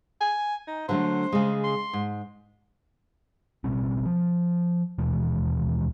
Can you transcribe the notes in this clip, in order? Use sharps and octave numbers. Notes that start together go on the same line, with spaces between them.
G#5
D#4
D3 F#3 A3 C5
C#3 G#3
C6
G#2
B2 G3 C4 C#4
F3
D#2 B2 E3 G#3